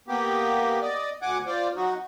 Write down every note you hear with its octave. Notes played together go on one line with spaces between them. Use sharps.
A#3 B3 G4
D5 D#5
D2 F#5 G#5 D6
F4 C5 D5
F#3 D#4 F#4